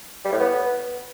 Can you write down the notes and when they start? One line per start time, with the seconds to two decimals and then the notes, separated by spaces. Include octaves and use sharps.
0.25 G3
0.32 A2
0.40 B3